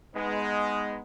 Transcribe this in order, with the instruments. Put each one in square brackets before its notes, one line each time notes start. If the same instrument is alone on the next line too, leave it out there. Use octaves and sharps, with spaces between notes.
[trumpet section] G#3 [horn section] B3 D#4